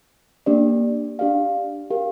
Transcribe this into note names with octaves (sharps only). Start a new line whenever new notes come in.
A#3 D4 G4 D5
D4 G4 D5 F5
G4 A#4 F5